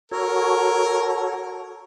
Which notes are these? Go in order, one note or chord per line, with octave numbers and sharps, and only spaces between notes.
F#4 A4 A#4 C#5